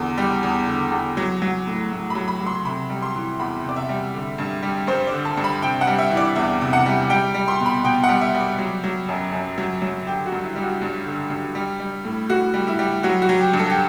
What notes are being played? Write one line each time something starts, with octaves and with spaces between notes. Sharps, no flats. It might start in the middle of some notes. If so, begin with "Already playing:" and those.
Already playing: E2 D3
G3
E2
D3
E2
F#3
F#3
A2
A2
F#3 B5
B5
F#3
C6
C3 B5
G3
C6
E3
E2 B5
C3 D5
E5
G3
D3
G2
G3
G2 C5
D5
D3
A5
G2
B5
C3 G5
F#5
G3
E5
E3
D5
E2 E5
C3
F#5
G3
G3 G5
G3
C6
B2
B5
B2 G5
F#5
G3
E5
G3
D5
F#3
F#3
F#2
F#2
F#3
F#3
D3 G4
F#4
G2
E4
G3
F#4
G2
D3
G2
G3
G3
A2
A2 F#4
G3
E4
G3
F#3 F#4
F#4
F#3
G4
G2
A4
G4